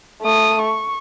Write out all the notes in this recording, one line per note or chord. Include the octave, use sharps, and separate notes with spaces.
A3 D#6
C#6